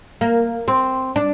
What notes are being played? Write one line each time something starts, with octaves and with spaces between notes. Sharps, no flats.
A#3
C4
D4